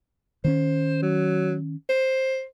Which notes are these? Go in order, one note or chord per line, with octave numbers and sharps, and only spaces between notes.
D#3 C4 C#4 C5
F#3
C5